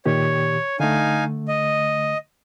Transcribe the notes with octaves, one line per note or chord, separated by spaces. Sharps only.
A#2 D#3 G4 C#5
D3 A3 D#4 F5 G#5
D#5